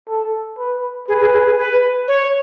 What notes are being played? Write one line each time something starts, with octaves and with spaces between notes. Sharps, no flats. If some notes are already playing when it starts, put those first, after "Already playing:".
A4
B4
G#4 B4
G#4
G#4
G#4
B4
C#5